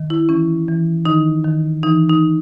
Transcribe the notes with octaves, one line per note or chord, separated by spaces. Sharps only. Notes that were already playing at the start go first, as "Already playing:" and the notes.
Already playing: D#3
E4
E3 C#4
E3
D#3 D#4
D#3
E3 D#4
D#4